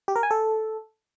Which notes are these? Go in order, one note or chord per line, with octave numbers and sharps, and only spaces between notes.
G4
A#4
G#5
A4